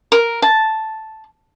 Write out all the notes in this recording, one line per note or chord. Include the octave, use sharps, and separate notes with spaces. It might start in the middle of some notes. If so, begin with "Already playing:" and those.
A#4
A5